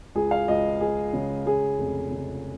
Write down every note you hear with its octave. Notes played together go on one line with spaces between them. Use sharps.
C#2 G#4
F5
C#2 D#5
G#3 G#4
C#3
G#3 G#4
F1
C#3